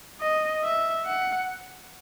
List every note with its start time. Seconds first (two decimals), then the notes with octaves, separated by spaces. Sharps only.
0.21 D#5
0.64 E5
1.06 F#5